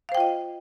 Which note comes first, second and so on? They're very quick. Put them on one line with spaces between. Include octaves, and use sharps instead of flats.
F5 C5 G5 F4 D#5